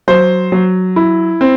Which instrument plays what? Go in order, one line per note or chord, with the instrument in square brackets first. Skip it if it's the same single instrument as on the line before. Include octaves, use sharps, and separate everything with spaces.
[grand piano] F#3 C5
F#3
E4
C4